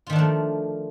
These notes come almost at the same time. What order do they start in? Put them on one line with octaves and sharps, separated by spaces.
F4 D#3 D4 F3 A3